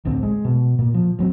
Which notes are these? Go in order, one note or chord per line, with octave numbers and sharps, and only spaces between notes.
A1 D2 C4
G#3
B2
A#2
F3
G2 F#3 C4